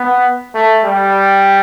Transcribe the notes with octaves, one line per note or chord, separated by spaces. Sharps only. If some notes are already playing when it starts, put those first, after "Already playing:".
Already playing: B3
A3
G3